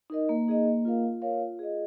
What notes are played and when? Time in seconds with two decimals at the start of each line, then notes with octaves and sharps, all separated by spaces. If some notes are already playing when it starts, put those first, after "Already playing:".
0.10 D#4 A#4 D#5
0.29 A#3
0.48 D#4 G#4 D#5
0.66 A#3
0.85 F4 A#4 F5
1.04 F4
1.22 A#4 C#5 F5
1.41 F4
1.59 G#4 D#5